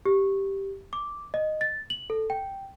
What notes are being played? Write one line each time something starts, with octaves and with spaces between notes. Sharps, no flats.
G4
D6
D#5
A6
F#7
A4
G5